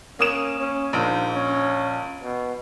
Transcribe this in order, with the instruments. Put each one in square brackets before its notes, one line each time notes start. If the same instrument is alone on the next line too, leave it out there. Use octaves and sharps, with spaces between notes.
[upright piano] A#3 D#6 E7 [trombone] C#4
[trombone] C#4
[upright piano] A#1 [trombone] G#2
[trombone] C#4
B2